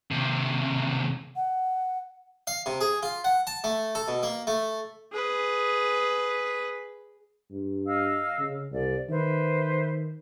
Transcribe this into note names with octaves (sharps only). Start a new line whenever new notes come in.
D#2 C3
F#5
F5
C3
G#4
F4
F#5
A5
A3
A4
B2
A#3
A3
G#4 B4
G2
D#5 F5 E6
C#3
C2 D5
D#3 B4 C5 E5